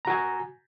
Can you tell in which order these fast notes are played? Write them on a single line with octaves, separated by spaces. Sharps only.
A#5 F#4 G#5